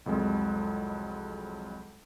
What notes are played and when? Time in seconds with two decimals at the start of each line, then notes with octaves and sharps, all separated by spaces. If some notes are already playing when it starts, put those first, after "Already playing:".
0.06 C2 F2 F#3 G#3